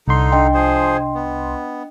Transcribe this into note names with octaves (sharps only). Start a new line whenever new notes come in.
C2 D3 D#4 C6
D4 D#5 G5
F3 G#4 C5
B3